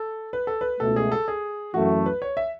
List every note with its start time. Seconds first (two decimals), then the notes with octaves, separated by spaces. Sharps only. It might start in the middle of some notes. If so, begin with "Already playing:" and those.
Already playing: A4
0.33 B4
0.47 A4
0.61 B4
0.80 C#2 B2 A3 A4
0.96 G#4
1.12 A4
1.28 G#4
1.74 F#2 E3 A3 F#4
2.06 B4
2.22 C#5
2.37 E5